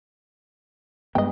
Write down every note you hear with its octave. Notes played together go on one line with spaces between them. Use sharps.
G2 G#3 B3 D#5 G5